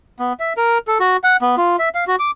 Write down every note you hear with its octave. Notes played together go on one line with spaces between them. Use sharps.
B3
E5
A#4
A4
F#4
F#5
B3
F4
E5
F5
F#4
D6